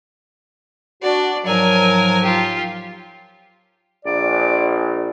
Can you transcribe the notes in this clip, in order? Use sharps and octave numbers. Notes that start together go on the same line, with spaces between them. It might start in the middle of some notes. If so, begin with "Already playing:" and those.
D4 F#4 D5
G#2 F3 F#3 A#4 G#5
F4 G4
A#1 D5